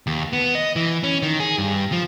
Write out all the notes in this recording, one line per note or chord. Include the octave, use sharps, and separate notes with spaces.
D#2
B3
D#5
E3
C#4
D#3
G#4
G2
F3